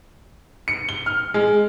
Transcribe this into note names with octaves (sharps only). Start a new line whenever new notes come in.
C#7
G7
F6
G#3